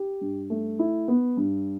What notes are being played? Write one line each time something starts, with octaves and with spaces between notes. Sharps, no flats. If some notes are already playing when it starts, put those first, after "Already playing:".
Already playing: G4
G2
A3
E4
B3
G2